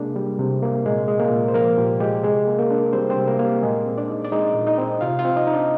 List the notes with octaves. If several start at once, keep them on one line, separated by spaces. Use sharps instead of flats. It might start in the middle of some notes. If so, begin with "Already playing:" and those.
Already playing: C3 G#3 A#3 D4 G#4
G3
C3
A#3
A#2 G#3 G#4
G#3
A#3 A#4
A#2
C5
F3 A#3 A#4
A#2 G4
G#3 G4
C3 G#3 G#4
A#3
A#3 A#4
D4
G3 C4 C5
C4 C5
C3
A#3 A#4
A#3
G4
A#2 G#3 G#4
C4
D4 D5
D#4
D5
G#3 D#4 D#5
A#2
D#4 D#5
C4
C3 F4 F5
F4 F5
C4
D#4 D#5
D#4
D4 D5